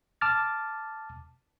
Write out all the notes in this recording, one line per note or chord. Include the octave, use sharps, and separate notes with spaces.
A5 D6 F6 A6